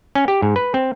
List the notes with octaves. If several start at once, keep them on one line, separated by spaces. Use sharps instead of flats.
C#4
G4
G#2
B4
C4